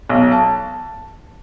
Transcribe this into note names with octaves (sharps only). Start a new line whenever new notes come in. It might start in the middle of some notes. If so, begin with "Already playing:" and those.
B1
A5